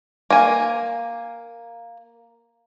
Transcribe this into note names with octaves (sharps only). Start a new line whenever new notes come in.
A#3 G#5